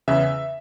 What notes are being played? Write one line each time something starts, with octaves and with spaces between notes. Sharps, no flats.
E2 C#3 E3 E5